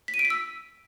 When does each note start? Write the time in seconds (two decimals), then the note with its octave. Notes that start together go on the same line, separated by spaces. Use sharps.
0.08 B6
0.14 D#7
0.19 D7
0.25 B6
0.30 E6